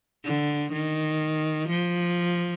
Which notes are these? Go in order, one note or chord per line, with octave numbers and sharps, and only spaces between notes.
D3
D#3
F3